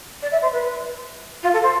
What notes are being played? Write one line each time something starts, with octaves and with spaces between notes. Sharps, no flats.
D5
E5
C5
B4
F4
A4
C5